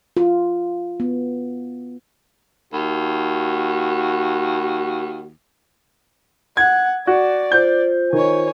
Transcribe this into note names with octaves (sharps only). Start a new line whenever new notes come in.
F4
B3
D#2 F#4
F#5 G#6
F#4 D5
F4 C5 G6
D#3 C#5 G#5